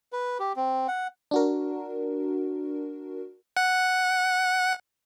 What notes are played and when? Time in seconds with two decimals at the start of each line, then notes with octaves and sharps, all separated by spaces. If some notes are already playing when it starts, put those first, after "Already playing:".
0.13 B4
0.40 G4
0.56 C4
0.88 F#5
1.31 D4 F#4 A#4
3.57 F#5